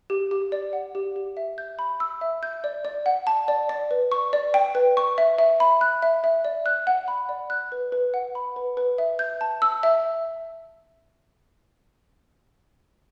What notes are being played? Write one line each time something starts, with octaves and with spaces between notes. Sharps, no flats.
G4
G4
D5
F#5
G4
G4
E5
G6
B5
E6
E5
G6
D5
D5
F#5
A5
D5
D5
B4
C#6
D5
G5
B4
C#6
E5
E5
B5
F#6
E5
E5
D5
F#6
F#5
B5
D5
F#6
B4
B4
F#5
B5
B4
B4
E5
G6
A5
E6
E5